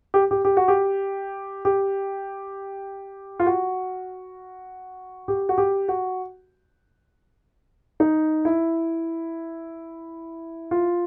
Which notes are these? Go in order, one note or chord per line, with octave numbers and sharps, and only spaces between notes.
G4
G4
G4
F#4
G4
G4
F4
F#4
G4
F#4
G4
F#4
D#4
E4
F4